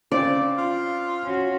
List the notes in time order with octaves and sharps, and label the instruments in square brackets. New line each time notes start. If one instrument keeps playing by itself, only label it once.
[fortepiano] C#3 C4 [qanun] D5
[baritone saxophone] F4
[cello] C#4 F#4